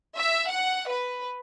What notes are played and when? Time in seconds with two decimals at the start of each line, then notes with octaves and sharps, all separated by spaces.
0.17 E5
0.48 F#5
0.88 B4